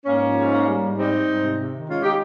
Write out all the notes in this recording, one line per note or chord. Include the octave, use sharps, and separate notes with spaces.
G#2 A#3 C#4
F3
G#2
A#3
G3
G#2
G3 C4 D#4
G3
G#2
C3
C3
D#3
G#3 C#4 F4
G#3 D#4 G4